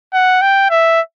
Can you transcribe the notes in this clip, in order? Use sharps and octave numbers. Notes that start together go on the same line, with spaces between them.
F#5
G5
E5